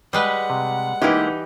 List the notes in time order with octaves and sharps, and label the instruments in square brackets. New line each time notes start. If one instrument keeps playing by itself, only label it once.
[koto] G3 G#3 B4 [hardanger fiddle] F#5
[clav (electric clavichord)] C3
[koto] E3 G4 [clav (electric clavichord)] G#3 A#3 E4 [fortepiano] D#4